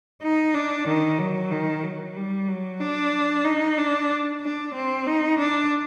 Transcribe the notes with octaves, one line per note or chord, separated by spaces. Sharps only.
D#4
D4
D#3
F#3
D#3
F#3
G3
F#3
D4
D#4
D4
D4
C4
D#4
D4